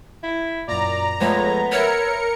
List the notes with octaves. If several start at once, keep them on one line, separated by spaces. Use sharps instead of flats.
E4
F#2 A#2 D5 A#5
F3 G#3 A3 B3 C#5
A#4 B4 C#5 E5 C#7